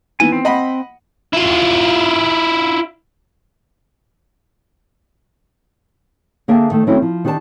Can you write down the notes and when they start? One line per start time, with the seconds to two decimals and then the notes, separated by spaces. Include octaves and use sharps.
0.20 D#3 E3 B3 G#5
0.32 C4
0.45 D#5 F#5 B5
1.33 E4 F4
6.48 D3 A#3 G#4 E5 G5 A5
6.71 D#3 A3
6.87 D#3 F#3 A3 C4 C#4 E4
7.02 F3
7.25 D#3 D4 G4 C5 A5